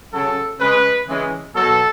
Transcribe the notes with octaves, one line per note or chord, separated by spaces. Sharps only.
C#3 F#3 A4
C#3 G#3 B4
C#3 E3 G#3
B2 F#3 A4